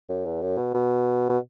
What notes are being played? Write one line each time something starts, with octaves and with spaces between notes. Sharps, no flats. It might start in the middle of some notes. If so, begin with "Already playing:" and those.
F#2
E2
F#2
B2
B2
B2